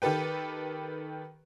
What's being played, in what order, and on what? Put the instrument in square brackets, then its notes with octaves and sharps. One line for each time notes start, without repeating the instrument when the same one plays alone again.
[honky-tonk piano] D#3 G4 A4 B4 G5